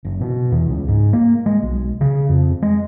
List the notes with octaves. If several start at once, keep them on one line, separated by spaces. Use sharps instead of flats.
F#1
B2
E2
C#2
G#2
A#3
G#3
B1
C#3
F2
G#3